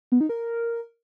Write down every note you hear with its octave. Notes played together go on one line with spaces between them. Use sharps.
B3
D#4
A#4